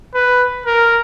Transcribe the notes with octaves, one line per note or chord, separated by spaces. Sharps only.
B4
A#4